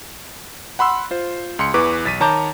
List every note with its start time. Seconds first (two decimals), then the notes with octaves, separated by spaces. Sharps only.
0.79 F#5 B5 C6 E6
1.11 F4 C5
1.59 C#2 C6 C#7
1.74 E2 E3 B4 C#6 D6
2.05 B1 A6 B6 D#7
2.20 D#3 C#5 A5 A#5 D6 G6